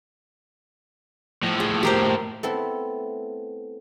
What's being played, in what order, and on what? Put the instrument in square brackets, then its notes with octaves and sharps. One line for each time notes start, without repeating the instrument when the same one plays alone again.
[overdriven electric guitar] A2 F3
[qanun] G#4
G4 A#4 C5
[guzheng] A3 B3 C4 E4 A4